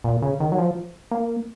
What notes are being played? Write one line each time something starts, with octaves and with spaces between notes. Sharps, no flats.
A#2
C#3
D#3
F#3
F3
A#3